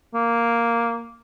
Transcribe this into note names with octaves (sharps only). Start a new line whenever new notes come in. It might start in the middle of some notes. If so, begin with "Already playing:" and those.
A#3